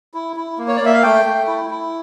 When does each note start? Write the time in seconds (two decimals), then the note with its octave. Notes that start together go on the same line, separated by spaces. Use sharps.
0.14 E4
0.36 E4
0.58 A#3
0.68 C#5
0.76 D5
0.81 A#3 E5
0.94 F5
1.03 A3 G5
1.25 A3
1.47 E4
1.70 E4